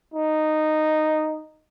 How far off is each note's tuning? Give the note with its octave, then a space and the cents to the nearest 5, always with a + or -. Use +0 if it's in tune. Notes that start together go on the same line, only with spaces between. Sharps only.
D#4 -10